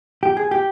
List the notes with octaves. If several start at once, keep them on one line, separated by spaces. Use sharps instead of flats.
G4
G#4
G4